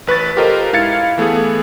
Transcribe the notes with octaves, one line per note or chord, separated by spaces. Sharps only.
A1 B4 C#6 A6
F4 G4 A4 A#4 C5 D#5
G#2 E4 F5 G#6 A6 C#7
E3 A3 B3 G#4